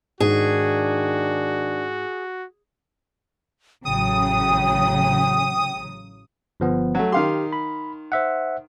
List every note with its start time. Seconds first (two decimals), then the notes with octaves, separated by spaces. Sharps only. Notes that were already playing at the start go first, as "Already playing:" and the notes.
0.20 G#2 D#3 D4 F#4 G#4
3.85 A1 C#3 F#3 G5 D#6
6.60 G1 F3 B3
6.95 F#3 A3
7.12 D#3 G4 F5 C6
7.53 B5
8.12 C5 E5 F#5